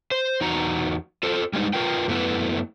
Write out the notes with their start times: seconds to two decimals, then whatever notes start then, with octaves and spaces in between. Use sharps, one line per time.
0.11 C5
0.41 E2 D#4 F#4 A#5
1.23 F4 A4 C5
1.53 G3 G#3 C#4 D#4
1.73 F4 A#4 B4 G5
2.08 F#2 A3 B3 E4 B4